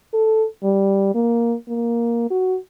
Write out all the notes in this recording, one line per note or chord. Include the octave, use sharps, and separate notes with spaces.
A4
G3
A#3
A#3
F#4